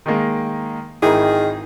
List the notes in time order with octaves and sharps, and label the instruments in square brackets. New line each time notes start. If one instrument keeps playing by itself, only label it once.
[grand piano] D#3 G#3 A#3
[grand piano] G#1 [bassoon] D#3 [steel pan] E4 A#4 [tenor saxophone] G#4